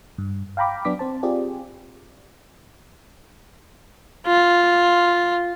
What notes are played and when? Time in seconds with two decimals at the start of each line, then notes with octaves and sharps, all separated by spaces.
0.18 G2
0.57 F5 G5 A#5 B5 D6
0.85 F#3 B3 D4 D6 B6
0.99 C4 C5 A5
1.23 C4 F4 G4 G#4 D5
4.27 F4